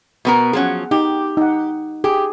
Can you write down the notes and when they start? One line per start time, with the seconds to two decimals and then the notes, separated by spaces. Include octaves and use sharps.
0.25 B2 B3 A#4
0.53 F3 F#3 C#4 G#4 F#5
0.91 D#4 G4
1.37 D#4 F#5
2.04 G4 G#4